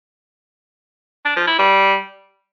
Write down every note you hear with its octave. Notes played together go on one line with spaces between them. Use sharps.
D4
F3
E4
G3